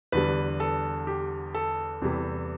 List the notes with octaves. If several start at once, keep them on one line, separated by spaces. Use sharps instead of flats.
E2 D3 G3 B4
A4
G4
A4
E2 C3 E3 G3